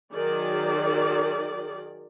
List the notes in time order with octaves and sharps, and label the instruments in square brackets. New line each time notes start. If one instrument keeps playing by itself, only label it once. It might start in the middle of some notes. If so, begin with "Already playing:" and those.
[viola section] D#3 F#3 G#4 D5